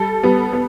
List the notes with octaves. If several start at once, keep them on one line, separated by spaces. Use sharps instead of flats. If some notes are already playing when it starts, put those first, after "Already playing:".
Already playing: G3 A4
G3 B3
B3